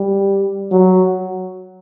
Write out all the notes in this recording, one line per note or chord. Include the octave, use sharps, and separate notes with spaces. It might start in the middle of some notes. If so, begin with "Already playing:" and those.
Already playing: G3
F#3